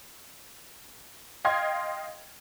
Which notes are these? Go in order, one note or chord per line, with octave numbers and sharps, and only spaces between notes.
D#5 F5 G5 C6 G#6